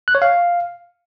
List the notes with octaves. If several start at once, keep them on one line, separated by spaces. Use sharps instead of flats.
F#6
C#5
F5